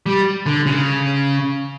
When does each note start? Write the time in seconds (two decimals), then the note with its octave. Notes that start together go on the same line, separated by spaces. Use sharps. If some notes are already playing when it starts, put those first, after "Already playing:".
0.06 G3
0.46 D3
0.66 C#3